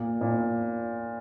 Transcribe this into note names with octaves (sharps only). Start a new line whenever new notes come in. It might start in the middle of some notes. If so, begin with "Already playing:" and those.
Already playing: A#2
A#2